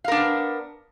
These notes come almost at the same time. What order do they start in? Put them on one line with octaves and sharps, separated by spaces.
F5 A#4 D4 B3